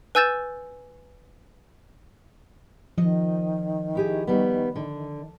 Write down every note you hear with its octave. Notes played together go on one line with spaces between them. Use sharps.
B4 G#5 E6 G6 A6 E7
D#3 F3 D#5
E4 G4 G#4
D#2 G3 B3
D3